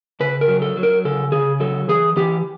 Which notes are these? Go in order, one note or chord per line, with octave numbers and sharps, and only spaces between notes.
C#3 B4
A#4
F#3
A4
F#3
A#4
C#3 A4
C#3 G#4
F#3 A4
E3 G#4
E3 G4